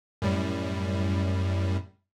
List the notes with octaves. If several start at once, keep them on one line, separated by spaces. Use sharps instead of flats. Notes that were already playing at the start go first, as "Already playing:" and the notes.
F#2 A2 G3